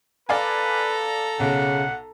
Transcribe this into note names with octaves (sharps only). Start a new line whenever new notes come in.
A4 B4 D5 F5 G#5 A#5
B1 C#3 F#5